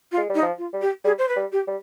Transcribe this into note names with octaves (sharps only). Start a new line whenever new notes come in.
F4
G#3
G3 D#4
F3
F4
G3
G4
G3 G#4
C5
B4
G3
G4
G3